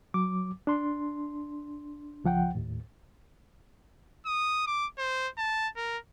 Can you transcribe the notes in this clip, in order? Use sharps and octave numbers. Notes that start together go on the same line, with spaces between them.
F#3 D6
D4 C6
C#2 F3 F#5 G5
D#2 A2
D#6
D6
C5
A5
A#4